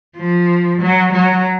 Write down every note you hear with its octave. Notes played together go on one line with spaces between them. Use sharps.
F3
F#3
F#3